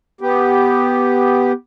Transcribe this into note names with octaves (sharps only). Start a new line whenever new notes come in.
B3 G4